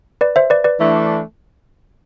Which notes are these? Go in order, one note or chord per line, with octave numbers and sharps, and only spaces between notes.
B4 D5
C5 E5
B4 D5
B4 D5
E3 A3 D4